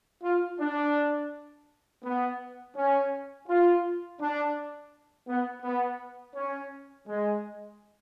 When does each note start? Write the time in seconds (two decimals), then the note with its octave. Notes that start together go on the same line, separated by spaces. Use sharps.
0.22 F4
0.59 D4
2.03 B3
2.75 C#4
3.48 F4
4.20 D4
5.27 B3
5.63 B3
6.35 C#4
7.08 G#3